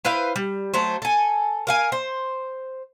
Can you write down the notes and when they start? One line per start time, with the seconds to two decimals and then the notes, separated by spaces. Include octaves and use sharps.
0.05 E4 B4 C5 F5
0.36 G3
0.74 F#3 A3 C5
1.02 A4 G#5
1.67 A#4 F5 G#5
1.92 C5